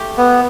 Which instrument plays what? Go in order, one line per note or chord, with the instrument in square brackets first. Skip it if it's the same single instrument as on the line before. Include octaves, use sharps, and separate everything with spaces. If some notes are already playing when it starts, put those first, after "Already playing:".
Already playing: [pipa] A3 G4
[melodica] B3